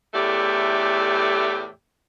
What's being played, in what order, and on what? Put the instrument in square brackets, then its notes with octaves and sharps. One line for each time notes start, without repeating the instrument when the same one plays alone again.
[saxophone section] E2 A2 A3 G4 D5